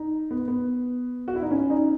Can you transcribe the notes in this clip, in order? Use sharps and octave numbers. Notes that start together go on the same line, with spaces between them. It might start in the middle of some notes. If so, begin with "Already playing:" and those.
Already playing: D#4
B3
B3
F#4
E4
D#4
C#4
D#4